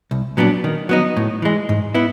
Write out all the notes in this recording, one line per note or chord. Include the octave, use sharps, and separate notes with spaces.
C2
A#2 F#3 B3 D4
D#3
F#3 B3 D#4
A2
E3 G#3
G#2
B3 E4